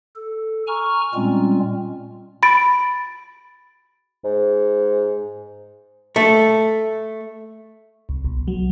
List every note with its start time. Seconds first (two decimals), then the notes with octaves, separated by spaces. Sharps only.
0.16 A4
0.67 G#5 A#5 C#6 F6
1.14 A#2 G3 G#3 C4 C#4 F4
2.43 B5 A6 D7
4.24 G#2
6.16 A3
8.09 C2
8.25 B1
8.48 F#3